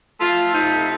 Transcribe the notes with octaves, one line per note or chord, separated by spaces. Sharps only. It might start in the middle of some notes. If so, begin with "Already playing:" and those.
A3 F4
C3 D#4